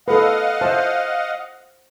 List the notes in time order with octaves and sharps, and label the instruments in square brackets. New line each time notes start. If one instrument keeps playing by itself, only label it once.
[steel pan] A4 B4 [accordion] D#5 F5 F#5
[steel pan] C5 E5 A5